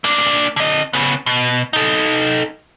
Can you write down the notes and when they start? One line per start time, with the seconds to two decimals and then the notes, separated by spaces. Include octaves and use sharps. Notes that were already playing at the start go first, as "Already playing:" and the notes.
0.04 A#3 D4
0.56 D3 D#5
0.93 C#3 B3
1.26 B2
1.73 D#4 A4